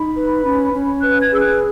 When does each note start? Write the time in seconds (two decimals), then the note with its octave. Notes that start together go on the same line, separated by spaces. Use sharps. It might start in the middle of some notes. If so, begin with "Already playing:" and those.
Already playing: D#4 B5
0.17 B4
0.45 C#4
0.73 C#4
1.02 B4 F#6
1.20 G#6
1.30 G#4 E6
1.40 F#6